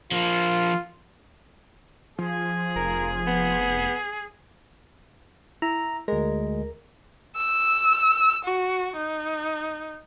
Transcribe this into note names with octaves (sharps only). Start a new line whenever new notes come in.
F3 A#3 F4
F3 G#4
F1 A#4
B3
E4 A#5
D2 G#3 A#4
E6
F#4
D#4